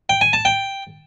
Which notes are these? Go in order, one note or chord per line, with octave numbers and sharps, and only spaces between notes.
G5
G#5
A5
G5